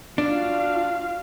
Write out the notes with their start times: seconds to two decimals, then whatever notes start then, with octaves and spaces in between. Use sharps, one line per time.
0.18 D4 F4 F#4 F5